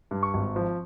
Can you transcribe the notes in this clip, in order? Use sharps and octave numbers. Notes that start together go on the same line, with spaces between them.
G2
C#6
G#1
F3